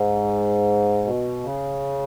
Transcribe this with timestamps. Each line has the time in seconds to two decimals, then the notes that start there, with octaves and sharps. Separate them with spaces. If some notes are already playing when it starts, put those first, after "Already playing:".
Already playing: G#2
1.05 B2
1.43 C#3